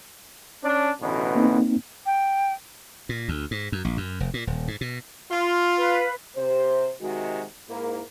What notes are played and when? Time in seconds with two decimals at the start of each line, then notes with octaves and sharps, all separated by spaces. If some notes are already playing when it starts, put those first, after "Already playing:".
0.64 C#4 D4
1.01 A1 D2 B2
1.35 A#3 C4 D#4
2.06 G5
3.09 A#2
3.28 D2
3.51 G#2
3.72 F#2
3.85 A#1
3.97 F#2
4.20 F1
4.34 A#2
4.47 D#1
4.68 G#2
4.81 B2
5.31 F4
5.77 B4 F5
6.36 C3 C5
7.01 C3 D#3 G#3 F#4
7.68 G#2 A#3 E4